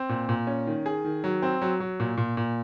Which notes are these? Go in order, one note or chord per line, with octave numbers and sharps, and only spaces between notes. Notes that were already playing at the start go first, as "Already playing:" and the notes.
Already playing: C4
A#2
A#2
C#4
D#3
G#4
D#3
F#3
C4
F#3
F#3
A#2
A#2
A#2